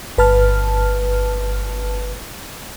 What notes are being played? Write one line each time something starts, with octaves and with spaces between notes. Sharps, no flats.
G1 B4 A5 F6